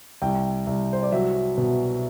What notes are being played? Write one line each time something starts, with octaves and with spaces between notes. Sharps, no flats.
C2 G5
C2
C5
D5
F#3 E5
B2